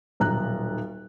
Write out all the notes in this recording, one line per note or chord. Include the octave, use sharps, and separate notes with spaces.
D#1 B1 A#5 F#6